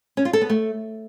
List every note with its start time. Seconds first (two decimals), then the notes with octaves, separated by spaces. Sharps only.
0.17 C#4
0.25 F4
0.33 A4
0.41 B3
0.50 A3